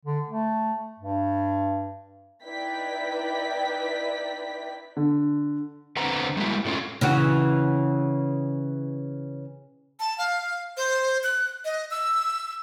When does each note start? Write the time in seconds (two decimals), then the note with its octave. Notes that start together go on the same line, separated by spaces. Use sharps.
0.05 D3
0.28 A3
0.99 G2
2.44 D#4 E4 B4 D5 G5 B6
4.97 D3
5.97 D3 C4 B4 C5 F#5 A#5
6.37 G3 G#3 A#3 E4 F#4
6.65 A2 A3 C#4 F4
7.01 C#3 E3 F#4
10.00 A5
10.18 F5
10.77 C5
11.24 F#6
11.65 D#5
11.91 E6